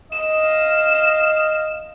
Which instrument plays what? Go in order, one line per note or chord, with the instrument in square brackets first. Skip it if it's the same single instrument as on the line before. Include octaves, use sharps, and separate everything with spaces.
[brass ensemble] D#5 [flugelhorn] F5 [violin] E7